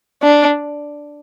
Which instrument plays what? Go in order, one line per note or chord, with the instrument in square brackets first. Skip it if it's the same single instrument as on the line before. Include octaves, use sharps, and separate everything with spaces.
[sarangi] D4